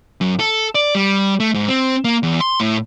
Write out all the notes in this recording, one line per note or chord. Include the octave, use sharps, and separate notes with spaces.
F#2
A4
D5
G3
A3
G#2
C4
A#3
E2
C6
A2